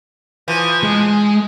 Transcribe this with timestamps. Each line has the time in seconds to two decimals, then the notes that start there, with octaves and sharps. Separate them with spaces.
0.48 E3 F3
0.83 G#3